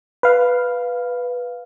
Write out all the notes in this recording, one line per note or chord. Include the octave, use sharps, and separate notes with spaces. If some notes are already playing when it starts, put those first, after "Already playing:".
B4 F5